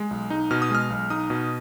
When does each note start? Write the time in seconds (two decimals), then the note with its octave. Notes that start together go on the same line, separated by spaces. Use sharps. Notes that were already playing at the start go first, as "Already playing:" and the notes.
Already playing: G#3
0.11 B1
0.30 D#4
0.51 B2 F6
0.62 D#6
0.70 G#3 F6
0.90 B1
1.10 D#4 D#6
1.30 B2